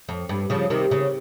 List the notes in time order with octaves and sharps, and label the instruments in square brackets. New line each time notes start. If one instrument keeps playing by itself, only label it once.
[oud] F2
G2
C#3 F3
C3 D#3
C#3